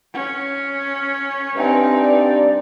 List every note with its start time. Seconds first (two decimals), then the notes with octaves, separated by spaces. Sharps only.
0.13 C#4
1.55 G2 C4 D#4 B4 E5 G#5
2.01 D5